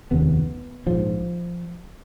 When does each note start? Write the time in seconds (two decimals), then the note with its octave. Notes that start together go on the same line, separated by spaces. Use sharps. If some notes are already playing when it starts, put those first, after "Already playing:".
0.11 F1 D#2 C#3 B3
0.86 A#1 G#2 F3